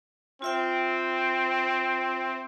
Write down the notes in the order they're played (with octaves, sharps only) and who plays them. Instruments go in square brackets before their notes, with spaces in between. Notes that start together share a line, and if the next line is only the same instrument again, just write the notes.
[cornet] C4 [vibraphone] F4 E5 G5